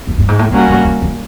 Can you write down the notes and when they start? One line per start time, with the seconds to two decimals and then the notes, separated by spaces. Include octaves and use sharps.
0.07 F#2
0.18 G2
0.28 G#2
0.39 A2
0.50 A#2 G3 A#3 C#4 F#4 A#4
0.67 A2
0.85 D#3
1.02 D#3